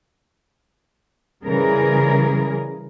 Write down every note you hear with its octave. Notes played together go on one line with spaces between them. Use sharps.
C#3 E3 G3 G#4 A#4